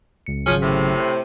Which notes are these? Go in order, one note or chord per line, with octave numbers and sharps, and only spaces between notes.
C#2 C#7
G#1 C#3 F3 F#3 C#4
A2 C3
C5